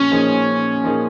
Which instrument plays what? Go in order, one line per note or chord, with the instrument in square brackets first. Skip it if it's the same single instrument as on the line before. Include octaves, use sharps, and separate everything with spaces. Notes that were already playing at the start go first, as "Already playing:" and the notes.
Already playing: [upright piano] A#2 F3 G#4 [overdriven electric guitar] C#4
[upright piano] A#2 F3 A#3 D#4 G#4
A#2 F3 A#3 D#4 G#4